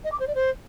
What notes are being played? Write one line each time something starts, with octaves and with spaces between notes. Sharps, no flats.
D#5
D6
C5
D5
C5